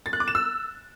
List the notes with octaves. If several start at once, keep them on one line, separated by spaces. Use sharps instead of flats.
A6
F#6
D6
E7
E6